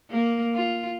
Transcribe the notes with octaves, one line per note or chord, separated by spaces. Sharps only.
A#3
F4